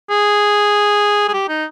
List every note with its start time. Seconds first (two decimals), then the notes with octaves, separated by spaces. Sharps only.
0.10 G#4
1.28 G#4
1.34 G4
1.49 D#4